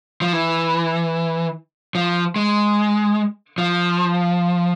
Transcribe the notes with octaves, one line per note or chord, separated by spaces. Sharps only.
F3
E3
F3
G#3
F3